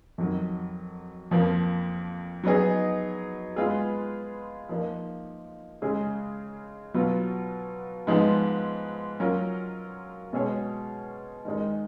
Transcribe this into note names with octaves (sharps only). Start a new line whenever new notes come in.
F2 D#3 F#3
F2 F3 A#3
F#3 B3 D#4 G#4 D#5
G#3 B3 F4 G#4 B4
F3 A#3 D#4
C#3 G#3 C#4 G#4
B2 F#3 B3 F4
G#2 F3 G#3 B3
F#3 C#4 F4 A#4
B2 G#3 C#4 G#4 C#5
G#2 D#3 G#3 D#4